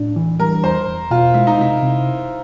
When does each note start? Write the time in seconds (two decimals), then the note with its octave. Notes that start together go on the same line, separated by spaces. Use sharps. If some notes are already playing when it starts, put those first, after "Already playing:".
Already playing: A2 D4
0.16 E3
0.40 G3 A#4
0.64 E2 C5
0.88 E2
1.11 B2 F4
1.34 G#3 E4
1.47 D#4
1.59 C3 E4
1.82 C3